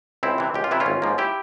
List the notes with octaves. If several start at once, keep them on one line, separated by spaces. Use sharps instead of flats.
C#2 C4 E4
C3 E3
C#2 G4
F4
C3 E3 E4
C#4 F4
G#1
G#2 F3 A#3
E4 G4